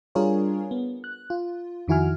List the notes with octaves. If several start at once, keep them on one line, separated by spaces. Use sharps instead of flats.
G3 D4 F4 G#4 A#4 C#5
B3
F#6
F4
F2 D#3 E4 F#4 G#5 F6